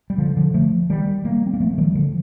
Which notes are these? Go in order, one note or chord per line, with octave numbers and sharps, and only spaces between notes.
G3
D3 F3
D3 F3
F3 A3
D#3 G3
G3 A#3
C4
A#3
F3 A3
A3
D#3 G3
D3 F3